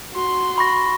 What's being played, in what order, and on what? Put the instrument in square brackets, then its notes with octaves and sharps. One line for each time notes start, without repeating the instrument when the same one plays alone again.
[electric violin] F#4 C6
[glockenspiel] B5 C#6 A#6